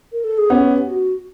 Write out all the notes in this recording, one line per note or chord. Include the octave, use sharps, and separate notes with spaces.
A#4
A4
G#4
B3 C#4 G4
F#4